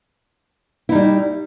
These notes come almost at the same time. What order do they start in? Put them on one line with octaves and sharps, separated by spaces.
E4 D#4 G3